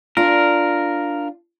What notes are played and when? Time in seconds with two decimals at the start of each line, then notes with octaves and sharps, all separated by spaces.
0.17 D4 F4 A#4